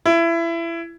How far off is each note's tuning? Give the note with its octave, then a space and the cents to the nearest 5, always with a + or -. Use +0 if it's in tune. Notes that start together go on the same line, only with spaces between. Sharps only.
E4 +25